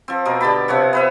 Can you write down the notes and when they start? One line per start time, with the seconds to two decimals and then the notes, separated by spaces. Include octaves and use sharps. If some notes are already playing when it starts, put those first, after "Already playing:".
0.08 F3 C4
0.25 B2 A#4 D#5
0.41 D3 G4 A5 B5
0.68 C3 F3 C#5 F#5
0.93 B3 B4 E5